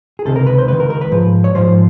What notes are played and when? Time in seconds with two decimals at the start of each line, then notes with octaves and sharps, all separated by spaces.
0.19 G#4
0.25 C#2 C3 D#3 A4
0.36 A#4
0.47 B4
0.58 C5
0.68 C#2 C3 D#3 B4
0.80 A#4
0.90 A#4
1.01 B4
1.12 G#2 F3
1.44 C#5
1.55 G#2 F3 C5